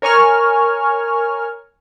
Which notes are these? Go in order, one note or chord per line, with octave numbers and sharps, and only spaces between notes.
A#4 C#5 G#5 C#6 F6